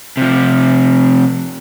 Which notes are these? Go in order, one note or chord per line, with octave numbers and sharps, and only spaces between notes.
C3 F3